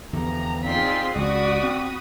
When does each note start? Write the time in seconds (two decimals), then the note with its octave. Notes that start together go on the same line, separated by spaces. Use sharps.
0.13 E2 D3 F3 B3 G4 A#5
0.64 C4 D#4 F4 G#4 D5 C6 B6
1.15 C#2 F#4 D5 B5 D#6
1.63 C4